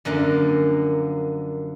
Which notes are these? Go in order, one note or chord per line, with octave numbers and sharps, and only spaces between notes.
F#2 D3 F3 A#3